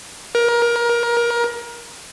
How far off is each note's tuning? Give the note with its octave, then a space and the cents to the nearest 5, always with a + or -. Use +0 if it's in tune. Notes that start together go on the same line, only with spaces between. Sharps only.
A#4 +25